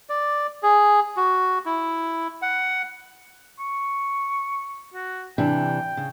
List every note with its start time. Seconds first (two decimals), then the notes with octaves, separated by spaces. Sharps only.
0.09 D5
0.63 G#4
1.17 F#4
1.66 E4
2.42 F#5
3.59 C#6
4.94 F#4
5.38 C3 E3 D4 G5
5.97 C#3